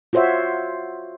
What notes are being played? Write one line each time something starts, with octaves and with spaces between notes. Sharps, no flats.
F4 F#4 C5 C#5 E5